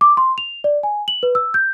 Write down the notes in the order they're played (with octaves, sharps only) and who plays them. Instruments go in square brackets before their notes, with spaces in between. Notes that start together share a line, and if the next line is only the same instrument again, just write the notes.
[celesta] D6
C6
F7
D5
G#5
F#7
B4
E6
G6